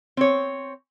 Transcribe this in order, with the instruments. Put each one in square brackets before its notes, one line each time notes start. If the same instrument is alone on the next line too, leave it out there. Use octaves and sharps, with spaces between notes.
[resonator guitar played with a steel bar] C4 C#5